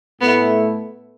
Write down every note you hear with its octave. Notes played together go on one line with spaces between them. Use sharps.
A2 A3 B3 E4